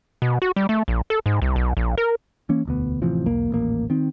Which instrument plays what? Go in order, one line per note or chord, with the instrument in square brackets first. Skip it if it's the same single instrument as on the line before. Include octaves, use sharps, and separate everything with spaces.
[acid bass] B2
F#4
G3
A3
A#1
A4
G#2
C2
B1
A#1
A#4
[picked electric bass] E3 A#3 C#4
E1 D2 B3
A1 C3 E3 F3
B1 E2 A#3
D#1 A1 A#3
D#3 C4